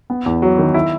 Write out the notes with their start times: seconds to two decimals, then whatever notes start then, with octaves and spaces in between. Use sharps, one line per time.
0.10 B3
0.26 E2
0.42 F#3
0.59 D#3
0.74 E4